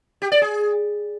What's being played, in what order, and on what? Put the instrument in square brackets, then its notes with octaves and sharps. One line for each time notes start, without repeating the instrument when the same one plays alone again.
[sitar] G4
D5
G#4